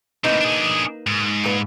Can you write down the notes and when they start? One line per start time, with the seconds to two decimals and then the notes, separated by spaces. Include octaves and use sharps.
0.24 A2 C3 A#3 D#4 B4
0.40 D4 G#4
1.07 G#2
1.44 A#2 B4